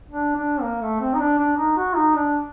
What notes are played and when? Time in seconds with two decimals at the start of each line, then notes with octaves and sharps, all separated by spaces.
0.11 D4
0.36 D4
0.61 A#3
0.82 A3
1.00 C4
1.14 D#4
1.19 D4
1.39 D4
1.57 D#4
1.77 F#4
1.96 D#4
2.15 D4